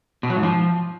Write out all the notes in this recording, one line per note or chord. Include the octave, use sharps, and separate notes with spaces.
B2
F#3
G#2
F3